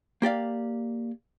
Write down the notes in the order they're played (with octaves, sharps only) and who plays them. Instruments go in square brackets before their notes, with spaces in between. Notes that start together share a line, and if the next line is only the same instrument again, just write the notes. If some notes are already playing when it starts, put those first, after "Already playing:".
[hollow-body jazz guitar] A#3 G4 D5 F5